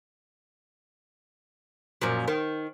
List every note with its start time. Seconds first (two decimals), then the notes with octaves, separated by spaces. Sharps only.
2.02 F#2 A#2 F3
2.28 D#3